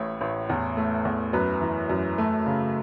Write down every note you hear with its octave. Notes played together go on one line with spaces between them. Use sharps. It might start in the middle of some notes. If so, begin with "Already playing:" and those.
Already playing: A1 A2 C#5
A1
E2
A3
E2
F#2 B4
E3
F#2
A3
C#3